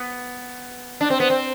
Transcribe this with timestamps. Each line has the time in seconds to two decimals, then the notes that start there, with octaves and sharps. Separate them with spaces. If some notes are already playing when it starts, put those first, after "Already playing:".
Already playing: B3
1.01 D4
1.10 C4
1.20 B3
1.30 C4